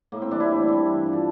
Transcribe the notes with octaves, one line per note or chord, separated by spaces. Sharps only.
A2 A#3
C4
E3 G3 D4
E4
A2
E3 G3
G2
F3
A4